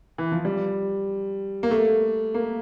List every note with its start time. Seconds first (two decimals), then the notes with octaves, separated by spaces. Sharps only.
0.18 E3
0.32 F3
0.45 G3
1.63 A#3
1.71 A3
2.34 A#3